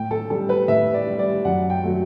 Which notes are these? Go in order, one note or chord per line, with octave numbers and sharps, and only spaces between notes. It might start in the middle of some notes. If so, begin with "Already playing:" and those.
Already playing: A2 G5
A4
G3 A4
B4
A2 E5
D5
G3
D5
F#2 F#5
G5
F#3 A3